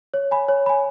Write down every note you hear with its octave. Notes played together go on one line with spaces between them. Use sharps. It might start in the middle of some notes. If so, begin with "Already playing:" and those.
C#5
G#5 B5
C#5
G#5 B5